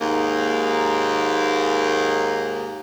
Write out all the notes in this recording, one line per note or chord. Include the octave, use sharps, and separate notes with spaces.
D#2 G#2 A#3